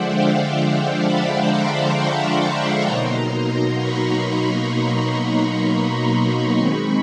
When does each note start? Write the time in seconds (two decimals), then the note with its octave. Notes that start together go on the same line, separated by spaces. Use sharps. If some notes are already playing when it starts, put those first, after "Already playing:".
Already playing: D3 F3 G#3 C5 D5 E5 F#5
0.08 F5 G5
1.01 A5 B5
1.47 A#5 C6
1.94 B5 C#6
2.40 A#5 C6
2.86 B2 F#3 A#3 D#4
3.79 B5 C#6
5.64 B5 C#6
6.57 D#3 G#3 C4 D#4 B5 C#6